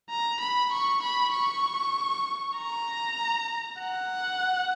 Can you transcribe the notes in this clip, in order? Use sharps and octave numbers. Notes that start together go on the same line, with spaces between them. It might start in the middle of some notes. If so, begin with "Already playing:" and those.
A#5
B5
C#6
B5
C#6
A#5
F#5